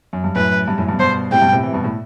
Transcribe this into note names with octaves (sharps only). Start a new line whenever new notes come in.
F#2
G2
F#2 A2 B4
G2
F#2 A2
G2 B2
G2 B2 C5
A2 C3 G5
G2 B2
A2 C3
C3 E3
G2 B2
A2